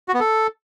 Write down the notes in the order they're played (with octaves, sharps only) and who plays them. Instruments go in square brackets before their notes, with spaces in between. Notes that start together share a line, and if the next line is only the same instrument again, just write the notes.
[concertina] F#4
B3
A4